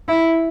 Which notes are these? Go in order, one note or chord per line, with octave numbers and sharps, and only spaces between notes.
E4